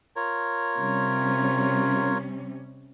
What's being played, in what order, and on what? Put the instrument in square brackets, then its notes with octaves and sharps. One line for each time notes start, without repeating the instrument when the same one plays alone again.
[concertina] F4 A#4 C#5
[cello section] C3 G3 C#4